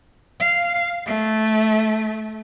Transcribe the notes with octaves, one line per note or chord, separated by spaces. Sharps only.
F5
A3